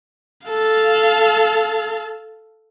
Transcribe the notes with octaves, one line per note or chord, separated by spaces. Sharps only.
A4 F5